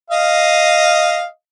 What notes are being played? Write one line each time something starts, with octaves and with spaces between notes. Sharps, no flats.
D#5 F5